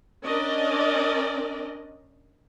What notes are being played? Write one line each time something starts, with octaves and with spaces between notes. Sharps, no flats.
C#4 D4 A#4 D5 D#5